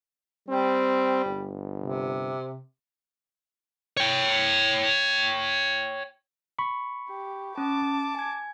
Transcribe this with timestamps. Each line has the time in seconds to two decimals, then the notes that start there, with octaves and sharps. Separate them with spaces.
0.49 G3 C4
1.26 G1
1.80 C3
3.97 C#5 G5
6.59 B5 C#6
7.10 G4
7.58 C#4 A5 D6
8.15 G#5 G#6